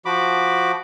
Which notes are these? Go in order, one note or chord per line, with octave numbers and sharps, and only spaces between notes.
F3 F#4 B5 D6